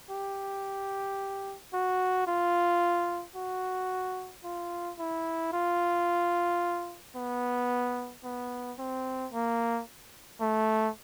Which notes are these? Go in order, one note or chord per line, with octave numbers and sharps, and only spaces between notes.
G4
F#4
F4
F#4
F4
E4
F4
B3
B3
C4
A#3
A3